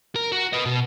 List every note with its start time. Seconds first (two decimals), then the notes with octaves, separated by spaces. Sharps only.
0.16 A#4
0.32 F#4
0.53 B4 D#5
0.65 B2